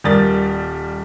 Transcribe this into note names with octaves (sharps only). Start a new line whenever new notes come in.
D#1 G3 A#4 D#6 A6